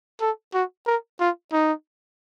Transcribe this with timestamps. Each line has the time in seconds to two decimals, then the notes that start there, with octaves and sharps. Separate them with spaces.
0.21 A4
0.54 F#4
0.86 A#4
1.20 F4
1.52 D#4